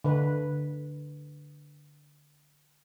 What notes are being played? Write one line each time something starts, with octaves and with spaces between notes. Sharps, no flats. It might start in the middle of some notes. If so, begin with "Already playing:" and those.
D3 B4